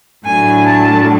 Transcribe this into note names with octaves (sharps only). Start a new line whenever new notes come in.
A2 F#3 A3 D4 G#5
A5